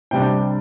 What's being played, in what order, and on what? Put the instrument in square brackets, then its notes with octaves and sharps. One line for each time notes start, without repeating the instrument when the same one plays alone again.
[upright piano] C3 G3 D4 G5